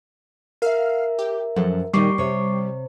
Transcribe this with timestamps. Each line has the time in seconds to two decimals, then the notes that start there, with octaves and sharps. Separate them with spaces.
0.62 A#4 E5 F5
1.19 G4
1.56 F#2 F3 A4 F#5
1.94 A#2 D#3 G3 D#4 C#6 D6 C7
2.18 C3 C#5